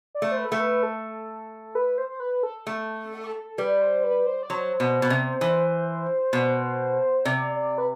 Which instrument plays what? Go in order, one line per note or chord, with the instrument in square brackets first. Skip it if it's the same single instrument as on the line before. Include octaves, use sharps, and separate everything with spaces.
[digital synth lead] D5
[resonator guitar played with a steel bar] A3
[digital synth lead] C5
B4
[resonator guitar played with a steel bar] A3 [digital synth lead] A4
[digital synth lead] B4
A4
B4
C5
C5
B4
A4
[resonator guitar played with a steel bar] A3
[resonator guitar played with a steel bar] G3 [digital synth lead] B4
[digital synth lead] C5
B4
C5
D5
[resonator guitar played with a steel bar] F#3 [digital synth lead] C5
[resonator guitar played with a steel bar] B2
B2
C3
E3
B2
[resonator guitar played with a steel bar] C3 [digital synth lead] D5
[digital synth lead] D5
B4